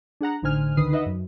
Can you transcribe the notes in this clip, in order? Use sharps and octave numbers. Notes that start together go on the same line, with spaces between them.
D4 G#4 F#5 A#5
A1 D3 D#4 C5 G#5 F6
C#2 D3 D#3 B4 D#6 C7
D#4 B4 D#5 E5 F#5
F#2